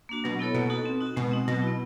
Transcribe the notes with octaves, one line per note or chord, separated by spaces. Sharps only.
A#3 D4 F#4
B2 F#3
B3 E4 A4 C#5
B2 A#3
D#4 F#4 A4
C4
D#4 F#4
B2 G#3
C4 D#4
B2 F#3
E4
B3